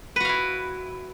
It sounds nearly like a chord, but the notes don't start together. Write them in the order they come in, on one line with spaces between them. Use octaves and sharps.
B4 F#4 F5 E4